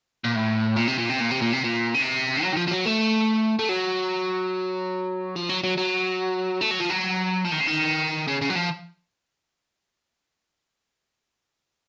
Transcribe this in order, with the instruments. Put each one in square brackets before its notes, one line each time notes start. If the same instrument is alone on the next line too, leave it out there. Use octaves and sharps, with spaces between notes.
[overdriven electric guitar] A#2
A2
A#2
C3
A#2
C3
A#2
C3
A#2
C3
A#2
C#3
C3
F#3
D#3
F3
F3
F#3
A3
A3
F#3
F3
F#3
F#3
F#3
A3
F#3
F3
F#3
F3
D#3
C#3
D#3
C#3
C#3
F#3
F3